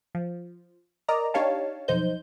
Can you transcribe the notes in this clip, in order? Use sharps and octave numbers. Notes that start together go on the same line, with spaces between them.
F3
A#4 D5 D#5 A#5
D4 D#4 G4 C#5 F5 A5
B1 F2 D#4 C5 G6